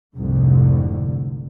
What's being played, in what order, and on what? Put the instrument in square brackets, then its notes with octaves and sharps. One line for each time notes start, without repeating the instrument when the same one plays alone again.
[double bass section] F1 C2 F2 G#2 D3